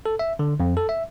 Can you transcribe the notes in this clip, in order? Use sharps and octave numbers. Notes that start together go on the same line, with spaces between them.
A4
E5
D3
F2
A4
E5